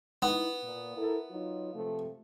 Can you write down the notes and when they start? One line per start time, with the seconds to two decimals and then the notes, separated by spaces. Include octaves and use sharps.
0.22 B3 D#4 E4
0.62 A#2
0.96 E4 A4 A#4
1.29 F#3 D#4 F4
1.74 C3 F3 A3